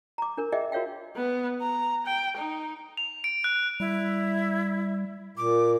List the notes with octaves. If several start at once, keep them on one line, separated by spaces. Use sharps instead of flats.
A#5 D6
D4 A#4
G#4 D#5 E5 G5
F#4 A#4 C#5 F5 G5
B3
A#5
G5
D#4
F7
D7
F#6
G3 E4
A#2 D6